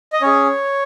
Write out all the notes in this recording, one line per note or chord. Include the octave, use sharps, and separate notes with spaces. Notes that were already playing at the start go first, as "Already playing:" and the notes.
D#5
C#4 G#4 C#5